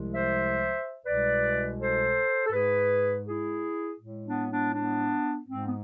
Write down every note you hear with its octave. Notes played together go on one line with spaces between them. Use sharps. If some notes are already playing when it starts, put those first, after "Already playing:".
Already playing: C2 C3 F3 G#3
C5 E5
C2 B2 G#3 B4 D5
A4 C5
A4
G#2 G#3 G#4 B4
E4 G#4
A2 G#3
B3 D4
B3 D4
B3 D4
G#2 G#3 C4
B3